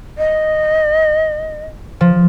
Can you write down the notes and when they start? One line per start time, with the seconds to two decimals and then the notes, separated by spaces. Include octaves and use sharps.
0.18 D#5
2.01 F3